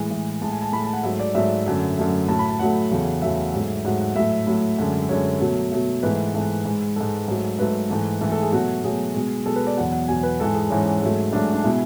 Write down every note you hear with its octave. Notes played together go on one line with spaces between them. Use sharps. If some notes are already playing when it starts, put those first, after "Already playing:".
Already playing: A2 E3 G#3
A2 E3 G#3
A2 G#3 A5
G#5
A5
A2 G#3 B5
A5
F#5
G#2 F#3 A3 E5
D5
G#2 F#3 A3 E5
F#2 D3 F#3 A3
F#2 D3 F#3 A3
A2 F#3 A3 A5
B5
A5
A2 F#3 A3 F#5
E2 C#3 F#3 A3
E2 C#3 F#3 A3 E5
G#2 F#3 A3
G#2 F#3 A3 F#5
F#5
A2 F#3 A3 E5
A2 F#3 A3
F#2 D3 G#3
F#2 D3 G#3 C#5
B2 F#3 A3
B2 F#3 A3
G#2 E3 A3 B4
G#2 E3 A3
G#2 G#3
G#2 G#3 A4
G#2 F#3 A3
G#2 F#3 A3 B4
G#2 E3 A3
G#2 E3 A3 A4
A4
G#4
B2 F#3 A3 F#4
B2 F#3 A3 G#4
B2 G#3
B2 G#3 A4
B4
D5
E2 B2 F#3 F#5
F#5
E2 B2 F#3 G#5
B4
G#2 E3 G#3 A4
G#4
G#2 E3 G#3 C#4
G#2 F#3 A3
G#2 F#3 A3 D4
D4
B2 G#3 E4